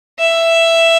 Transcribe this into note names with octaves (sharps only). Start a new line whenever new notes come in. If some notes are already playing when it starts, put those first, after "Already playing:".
E5